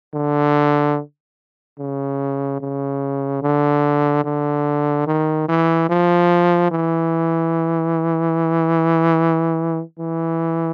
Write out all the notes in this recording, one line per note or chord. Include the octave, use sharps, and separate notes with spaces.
D3
C#3
C#3
D3
D3
D#3
E3
F3
E3
E3